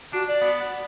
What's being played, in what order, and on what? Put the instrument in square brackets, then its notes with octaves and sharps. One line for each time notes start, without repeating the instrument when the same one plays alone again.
[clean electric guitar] D4 [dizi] F#4
[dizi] D5
[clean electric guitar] B3